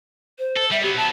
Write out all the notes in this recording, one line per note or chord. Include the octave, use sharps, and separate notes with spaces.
C5
A4
G3 E5
F#3 B3 G4
A5